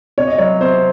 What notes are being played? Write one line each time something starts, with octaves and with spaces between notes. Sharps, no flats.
C3 C#5
D#5
F#3 C#5
C3 C5